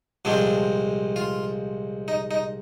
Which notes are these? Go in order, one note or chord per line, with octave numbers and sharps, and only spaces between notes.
C2 A#2 F3 G#3 C4 D4
F4
D#4
D#4